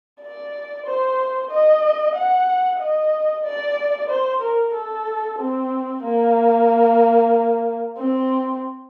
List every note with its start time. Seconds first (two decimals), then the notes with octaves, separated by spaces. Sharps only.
0.21 D5
0.86 C5
1.51 D#5
2.15 F#5
2.80 D#5
3.44 D5
4.09 C5
4.41 A#4
4.74 A4
5.39 C4
6.03 A#3
7.98 C4